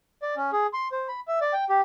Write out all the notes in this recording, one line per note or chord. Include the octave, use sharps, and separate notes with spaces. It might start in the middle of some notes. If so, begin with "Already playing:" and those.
D5
C#4
G#4
C6
C5
B5
E5
D5
G5
G4